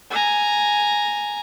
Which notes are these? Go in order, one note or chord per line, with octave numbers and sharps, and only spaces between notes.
G#5 A#5